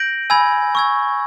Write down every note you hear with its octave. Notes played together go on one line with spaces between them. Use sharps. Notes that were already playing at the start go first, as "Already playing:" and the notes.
Already playing: G6 A#6 D7 F#7
G#5 B5 E6 G#6
C#6 E6 G#6